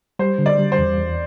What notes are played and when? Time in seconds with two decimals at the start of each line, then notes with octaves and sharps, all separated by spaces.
0.19 G3 C5
0.38 D3
0.46 D5
0.59 G3
0.72 C5
0.78 E2
0.98 E2